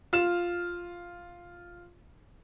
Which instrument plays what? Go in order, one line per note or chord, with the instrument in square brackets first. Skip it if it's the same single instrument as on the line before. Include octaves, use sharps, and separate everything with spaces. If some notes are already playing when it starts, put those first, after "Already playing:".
[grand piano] F4 F6 E7